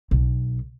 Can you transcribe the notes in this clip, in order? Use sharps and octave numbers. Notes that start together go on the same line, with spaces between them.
B1